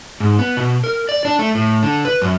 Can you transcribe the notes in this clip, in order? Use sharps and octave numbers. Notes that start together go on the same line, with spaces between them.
G#2
B3
B2
A#4
D5
D4
A3
A2
D3
B4
F#2